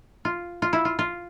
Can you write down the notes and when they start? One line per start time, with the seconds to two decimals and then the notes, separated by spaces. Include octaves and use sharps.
0.25 F4
0.62 F4
0.73 E4
0.85 F4
0.99 F4